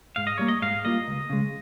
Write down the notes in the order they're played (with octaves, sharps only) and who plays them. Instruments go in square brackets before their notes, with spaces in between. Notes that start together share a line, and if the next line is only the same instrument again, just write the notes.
[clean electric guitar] G#2 [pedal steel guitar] F5
[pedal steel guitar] D#5
[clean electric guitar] G3 A#3 [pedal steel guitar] C#5
[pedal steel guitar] D#5
[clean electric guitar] G#2 [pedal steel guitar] F5
[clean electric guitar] G3 A#3 F4 [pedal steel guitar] D#5
[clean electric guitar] C#2
C#3 G#3